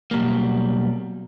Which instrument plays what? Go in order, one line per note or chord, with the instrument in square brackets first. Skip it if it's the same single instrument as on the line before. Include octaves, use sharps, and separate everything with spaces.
[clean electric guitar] B2 F#3 G3 A#3